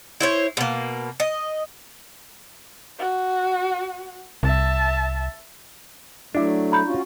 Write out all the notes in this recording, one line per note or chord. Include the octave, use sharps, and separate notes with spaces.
E4 C5 C#5
B2 A#3
D#5
F#4
C2 E5 A5
F#3 A3 D4 E4
A#5 B5 G6
C#4 F4 F#4